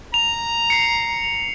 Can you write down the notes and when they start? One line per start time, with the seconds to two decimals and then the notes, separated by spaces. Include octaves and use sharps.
0.14 A#5 F7
0.70 C7 C#7